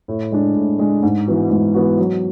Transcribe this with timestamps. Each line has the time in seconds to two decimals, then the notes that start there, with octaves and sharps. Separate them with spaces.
0.08 A2
0.32 G#3 D4
0.56 A2
0.79 G#3 D4
1.03 G#2
1.27 E3 B3 F#4
1.51 G#2
1.74 E3 B3 F#4
1.98 F#3